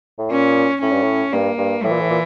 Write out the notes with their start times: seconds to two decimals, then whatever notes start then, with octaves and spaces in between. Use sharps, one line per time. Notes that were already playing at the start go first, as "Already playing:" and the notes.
0.18 A2
0.31 A#2 C#4
0.81 A2 C#4
0.92 G2
1.02 A2
1.32 G2 A#3
1.58 G2
1.84 A2 E3
1.92 A#2
2.01 A2
2.10 A#2